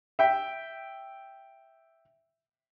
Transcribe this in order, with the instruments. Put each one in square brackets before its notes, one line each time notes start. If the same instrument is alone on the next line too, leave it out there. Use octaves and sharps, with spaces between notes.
[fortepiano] E5 G5